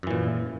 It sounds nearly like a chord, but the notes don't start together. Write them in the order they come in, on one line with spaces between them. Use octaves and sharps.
F#2 E3 A#2